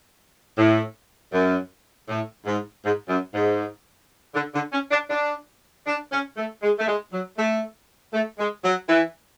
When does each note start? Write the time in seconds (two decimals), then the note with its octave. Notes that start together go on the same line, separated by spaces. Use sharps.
0.57 A2
1.33 F#2
2.09 A2
2.46 G#2
2.84 G#2
3.09 F#2
3.34 G#2
4.35 D3
4.54 D3
4.73 C#4
4.91 D4
5.10 D4
5.87 D4
6.12 C#4
6.37 A3
6.62 G#3
6.79 A3
6.87 G#3
7.12 F#3
7.37 A3
8.13 A3
8.39 G#3
8.64 F#3
8.88 E3